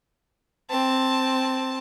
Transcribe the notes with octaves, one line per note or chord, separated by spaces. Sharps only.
C4 A5